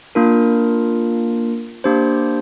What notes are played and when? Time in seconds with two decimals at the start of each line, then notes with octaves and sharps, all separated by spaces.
0.15 A#3 D4 F4 A#4
1.84 A#3 D4 G4 C5